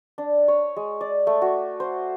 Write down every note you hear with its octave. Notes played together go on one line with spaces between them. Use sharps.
D4
C#5
G#3
D5
A3
F#4
C5